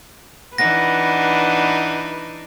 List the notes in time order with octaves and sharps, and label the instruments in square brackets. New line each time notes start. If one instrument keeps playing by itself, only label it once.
[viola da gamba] E3 D4 D#4 [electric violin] B4 [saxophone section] F#5 [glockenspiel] A#6